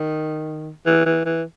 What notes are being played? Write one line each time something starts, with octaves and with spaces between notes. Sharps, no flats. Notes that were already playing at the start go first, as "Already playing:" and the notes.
Already playing: D#3
E3
E3
E3